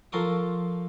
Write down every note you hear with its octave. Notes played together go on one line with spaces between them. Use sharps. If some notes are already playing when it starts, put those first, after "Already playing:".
F3 A4 A#4 C6 C#6 D#6